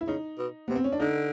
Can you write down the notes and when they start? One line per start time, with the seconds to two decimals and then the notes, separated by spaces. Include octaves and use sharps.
0.01 E4
0.07 C#3 D#4
0.38 B2
0.68 C3 B3
0.76 C4
0.84 C#4
0.92 D4
1.00 D3 D#4